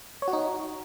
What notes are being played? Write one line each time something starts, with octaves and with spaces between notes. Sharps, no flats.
C#5
F#4
D#4